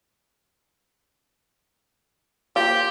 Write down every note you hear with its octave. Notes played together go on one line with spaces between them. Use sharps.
F3 A#3 G4